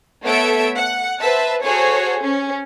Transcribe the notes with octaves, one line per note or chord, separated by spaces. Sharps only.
A3 B3 A4 C#5 E5 D7
F#5
B4 C5 E5 A5
F#4 G#4 A4 C5 C#5
C#4